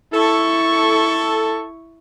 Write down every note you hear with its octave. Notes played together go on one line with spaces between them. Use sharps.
E4 A4 C#6